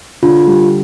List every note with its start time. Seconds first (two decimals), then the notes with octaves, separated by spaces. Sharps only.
0.22 D3 F4
0.47 G3